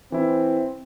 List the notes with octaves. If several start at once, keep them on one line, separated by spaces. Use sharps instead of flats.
E3 C4 E4